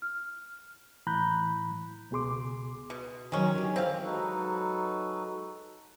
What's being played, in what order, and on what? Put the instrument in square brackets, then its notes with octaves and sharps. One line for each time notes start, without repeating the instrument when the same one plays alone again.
[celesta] F6
[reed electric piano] A2 E3 A#5 B5 F#6 G6
C#2 B2 G#4 C6 D6
[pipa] B2
[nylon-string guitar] D#3 F3 F#3 [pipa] G#3 C#4
[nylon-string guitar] D3 G4
[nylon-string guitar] E3 [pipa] C4 F5
[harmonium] F#3 G#3 D#4 F#4 A4 B4